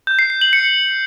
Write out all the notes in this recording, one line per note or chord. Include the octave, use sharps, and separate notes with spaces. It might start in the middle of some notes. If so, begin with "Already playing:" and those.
G6
C7
C7
F#7
C#7